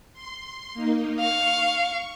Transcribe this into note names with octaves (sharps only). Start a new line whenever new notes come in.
C6
A#3 D#4
F5 C#6